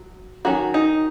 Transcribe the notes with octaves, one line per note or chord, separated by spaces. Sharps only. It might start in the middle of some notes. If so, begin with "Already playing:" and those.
Already playing: F#3
D#3 F#3 C#4 F#4
D#4